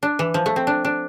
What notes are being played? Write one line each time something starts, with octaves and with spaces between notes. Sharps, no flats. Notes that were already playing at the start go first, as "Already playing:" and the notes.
D4
E3
F3
A3
C4
D4
D4